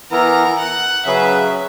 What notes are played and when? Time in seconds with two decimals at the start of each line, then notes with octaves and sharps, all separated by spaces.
0.11 E3 B3 E4 A#4 A#5
0.58 F#5
1.05 C#3 F#3 C#4 G#4 B4 E5